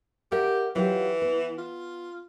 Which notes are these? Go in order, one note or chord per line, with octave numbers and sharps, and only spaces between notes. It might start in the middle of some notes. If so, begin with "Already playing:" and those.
G4 A#4 E5 F#5
E3 F#3 F4 G4
B3 B4
F4